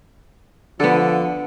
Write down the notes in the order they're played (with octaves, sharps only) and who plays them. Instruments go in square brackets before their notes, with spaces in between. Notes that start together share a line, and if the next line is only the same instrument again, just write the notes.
[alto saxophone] D3 [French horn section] F3 [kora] B3 A4